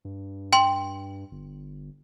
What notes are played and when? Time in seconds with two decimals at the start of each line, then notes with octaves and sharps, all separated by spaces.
0.05 G2
0.53 G5 C6
1.31 G1